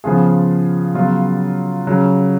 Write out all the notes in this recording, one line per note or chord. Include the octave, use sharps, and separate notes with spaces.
C#3 F3 B3 F4 G#4
C#3 F#3 B3 F4
C#3 F#3 C#4